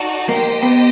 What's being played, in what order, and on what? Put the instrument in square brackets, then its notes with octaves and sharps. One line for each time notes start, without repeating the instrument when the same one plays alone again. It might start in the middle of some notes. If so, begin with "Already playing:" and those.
Already playing: [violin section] D#4 F#4 A4 D5
[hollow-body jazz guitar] A#3 [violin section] G4 C5 D#5 G5
[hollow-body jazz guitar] B3